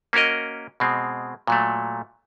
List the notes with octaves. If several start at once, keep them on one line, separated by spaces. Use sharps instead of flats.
A#3 C#4 F#4 A#4 D#5
B2 G#3 C4
A#2 F#3 A3